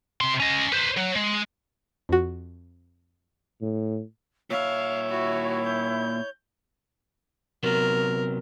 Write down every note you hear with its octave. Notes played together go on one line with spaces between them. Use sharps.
C3 C6
C#4 D#5
B4 C5
F#3
G#3
F2 F#4
A2
A#2 C#5 E5 F5
E4 F#4
G6
C3 F#3 B3 A#4